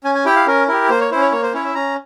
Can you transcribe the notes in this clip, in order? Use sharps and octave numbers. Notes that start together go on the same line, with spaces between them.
C#4 G#5
G#5
E4 G4 G5
F5
C#4 A#4
E4 G4 A#4
A#3 C5
C#5
C#4 E4 C5
C#5
A#3 C#5
C5
C#4 E4 C#5
E5
C#4 A#5